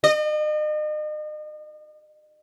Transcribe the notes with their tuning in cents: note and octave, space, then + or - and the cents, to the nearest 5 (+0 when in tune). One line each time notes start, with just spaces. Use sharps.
D#5 -40